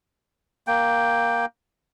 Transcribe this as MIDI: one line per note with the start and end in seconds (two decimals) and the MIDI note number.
0.67 1.46 58
0.67 1.46 79